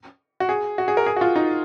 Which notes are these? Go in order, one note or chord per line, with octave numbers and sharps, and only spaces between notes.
F#4
G#4
F#4
G#4
A#4
G#4
F#4
F4
D#4